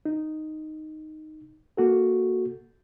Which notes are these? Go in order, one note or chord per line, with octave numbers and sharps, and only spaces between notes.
D#4
A#3 F#4 A4